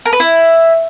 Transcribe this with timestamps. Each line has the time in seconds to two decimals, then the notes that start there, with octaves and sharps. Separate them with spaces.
0.06 A#4
0.13 B4
0.20 E4